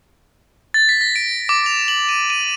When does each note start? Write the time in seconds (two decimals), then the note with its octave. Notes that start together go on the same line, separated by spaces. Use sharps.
0.74 A6
0.89 B6
1.01 A#6
1.16 D7
1.49 D6
1.66 F7
1.88 F#7
2.09 D#7
2.30 D#7